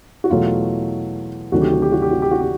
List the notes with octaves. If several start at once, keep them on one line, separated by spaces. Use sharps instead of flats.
F#4
E2 B2 F#3 A3 F4
D2 C3 D#3 F#3 A3 F#4
G4
F#4
G4
F#4
G4
F#4
G4
F#4
G4